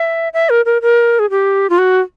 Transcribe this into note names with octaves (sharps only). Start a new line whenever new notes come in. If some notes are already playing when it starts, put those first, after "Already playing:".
Already playing: E5
E5
A#4
A#4
A#4
G#4
G4
F4
F#4